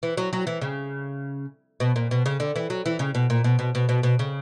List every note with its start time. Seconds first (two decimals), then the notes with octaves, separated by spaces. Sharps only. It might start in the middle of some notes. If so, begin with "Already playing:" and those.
0.03 E3
0.17 F#3
0.33 F#3
0.47 E3
0.61 C#3
1.80 B2
1.96 A#2
2.11 B2
2.26 C#3
2.40 D3
2.56 E3
2.70 F#3
2.86 E3
2.99 C#3
3.15 B2
3.30 A#2
3.44 B2
3.59 B2
3.75 B2
3.89 B2
4.03 B2
4.19 C#3